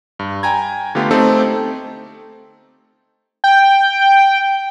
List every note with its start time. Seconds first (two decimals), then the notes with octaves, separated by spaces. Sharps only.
0.19 G2
0.43 G5 G#5 A#5 G#6
0.95 D3 A3 B3 F4 G4
1.11 A3 C4 D#4 G4 A4
3.44 G5